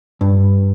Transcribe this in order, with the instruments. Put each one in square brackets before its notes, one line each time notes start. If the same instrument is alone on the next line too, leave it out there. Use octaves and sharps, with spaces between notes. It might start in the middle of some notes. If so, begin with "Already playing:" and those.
[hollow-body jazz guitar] G2